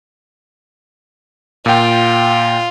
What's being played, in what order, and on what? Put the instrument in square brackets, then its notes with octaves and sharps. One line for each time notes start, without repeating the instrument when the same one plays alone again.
[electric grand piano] A#2 G5 [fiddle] F4